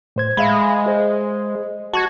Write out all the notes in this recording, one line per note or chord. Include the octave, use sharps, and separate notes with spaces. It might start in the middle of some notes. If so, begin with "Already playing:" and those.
A2 C5 G#6
G#3 E5 F5 B5
G#4 C5
F#4 A5 C#6 G#6